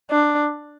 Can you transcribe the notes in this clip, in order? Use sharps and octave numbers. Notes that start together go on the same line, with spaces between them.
D4